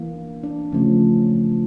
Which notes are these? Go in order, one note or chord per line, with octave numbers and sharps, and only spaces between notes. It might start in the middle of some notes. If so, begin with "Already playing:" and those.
Already playing: E3 A#3
D4
D4
C#3 F3 A3 C#4